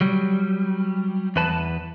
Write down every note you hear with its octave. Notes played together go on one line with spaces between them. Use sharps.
F#3 G3
E2 B4 A5